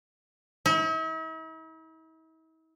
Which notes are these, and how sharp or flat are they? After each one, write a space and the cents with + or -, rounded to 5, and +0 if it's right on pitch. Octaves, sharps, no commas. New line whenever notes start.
E4 -45